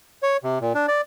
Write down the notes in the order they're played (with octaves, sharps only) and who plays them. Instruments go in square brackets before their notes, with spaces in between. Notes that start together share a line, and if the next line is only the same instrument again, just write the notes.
[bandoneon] C#5
C3
A#2
D4
D5